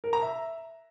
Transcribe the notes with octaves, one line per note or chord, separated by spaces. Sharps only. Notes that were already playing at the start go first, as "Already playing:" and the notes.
A#4
A#5
E5